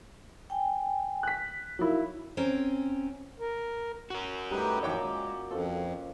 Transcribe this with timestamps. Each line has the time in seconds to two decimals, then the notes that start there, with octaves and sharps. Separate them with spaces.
0.50 G5 G#5
1.23 F#6 B6
1.79 F#3 D#4 E4 A#4 F5
2.37 C4 C#4 A#4
3.40 A#4
4.10 F#4 A#4
4.51 A2 G3 D#4 G4 B4 A#5
4.83 F#2 A#2 D#3 F3 C#5 D5 G5 D6
5.02 G#3
5.51 F2 F3 C#4 A4